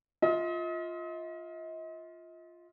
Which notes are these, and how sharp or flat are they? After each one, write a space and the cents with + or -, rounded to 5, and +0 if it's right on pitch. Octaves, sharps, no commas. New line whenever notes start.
F4 +0 D#5 +40